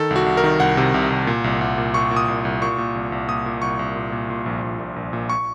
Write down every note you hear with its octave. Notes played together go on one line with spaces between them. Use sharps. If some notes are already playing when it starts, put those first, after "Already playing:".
Already playing: D#3 A4
C2
F#4
C2
A#4
D#3
C2 F#5
C3
C2
C2
A#2
C2
C2
A#2
A#2 C#6
A#2
D#6
C2
C2
A#2 C#6
A#2
C2
C2
A#2 D#6
A#2
C2 C#6
C2
A#2
A#2
A#2
A#1
A#1
A#2
A#1
A#2
C#6